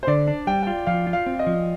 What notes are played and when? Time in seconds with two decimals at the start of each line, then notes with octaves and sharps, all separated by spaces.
0.03 C5
0.07 D3 D5
0.28 D4
0.47 G3 G5
0.63 F4 G5
0.86 F3 F5
1.07 F4
1.13 F5
1.26 C4
1.39 D#5
1.47 F3